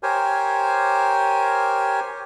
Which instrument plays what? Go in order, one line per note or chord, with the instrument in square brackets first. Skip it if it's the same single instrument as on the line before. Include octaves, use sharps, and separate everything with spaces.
[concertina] G4 A#4 C5 C#5 G#5